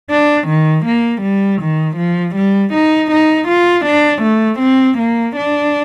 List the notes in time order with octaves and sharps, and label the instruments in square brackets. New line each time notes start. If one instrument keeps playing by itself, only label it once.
[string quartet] D4
D#3
A#3
G3
D#3
F3
G3
D#4
D#4
F4
D4
A3
C4
A#3
D4